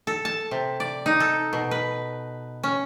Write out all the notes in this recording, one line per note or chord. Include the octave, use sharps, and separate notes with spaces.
A4
A5
C3
D5
D#4
A4
B2
B4
C#4